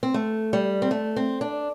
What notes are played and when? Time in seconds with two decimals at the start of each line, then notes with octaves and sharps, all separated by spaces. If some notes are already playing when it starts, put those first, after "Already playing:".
0.03 C4
0.14 A3
0.53 G3
0.82 C4
0.91 A3
1.16 C4
1.41 D4